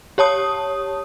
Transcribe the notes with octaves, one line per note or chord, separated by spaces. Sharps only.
G4 C#5 A5 D#6